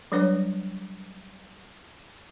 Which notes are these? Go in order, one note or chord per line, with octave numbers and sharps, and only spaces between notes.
F#3 G3 D4 B4 C#5